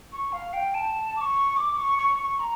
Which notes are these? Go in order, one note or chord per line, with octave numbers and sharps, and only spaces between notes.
C#6
F5
G5
A5
D6
C#6
D6
C#6
C#6
C#6
A#5